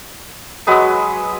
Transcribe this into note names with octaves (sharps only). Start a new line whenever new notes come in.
F#3 G#3 B4 D#6